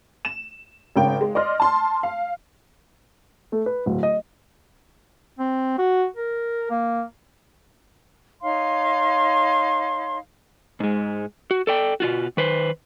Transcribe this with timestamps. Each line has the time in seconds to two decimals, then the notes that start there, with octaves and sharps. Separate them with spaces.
0.25 E7
0.96 G#1 C#3 G5
1.21 G#3
1.35 D5 D#5 C6 F6
1.60 A5 C6
2.03 F5
3.52 A3
3.66 B4
3.86 D1
4.03 D#5
5.39 C4
5.78 F#4
6.16 A#4
6.70 A#3
8.42 D#4 C#5 F5 C6
10.80 G#2 G#3
11.51 F#4
11.67 A4 D5 G5
12.00 B2 F4 F#4
12.37 D#3 B4 C5